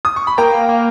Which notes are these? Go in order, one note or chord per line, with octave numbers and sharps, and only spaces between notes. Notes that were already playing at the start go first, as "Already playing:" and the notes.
D#6
C#6
B5
A#3 G5 A#5
A#3